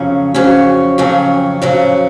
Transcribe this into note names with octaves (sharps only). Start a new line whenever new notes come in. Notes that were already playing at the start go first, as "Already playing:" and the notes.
Already playing: F2 C#3 F#3 C#4
F2 C#3 F#3 C#4
F2 C#3 F#3 C#4
F2 C#3 F#3 C#4